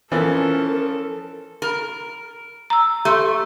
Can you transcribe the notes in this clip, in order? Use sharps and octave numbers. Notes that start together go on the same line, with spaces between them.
E3 F3 C#4 A4 A#4 A6
A#4
A#5 E6
A3 G4 C6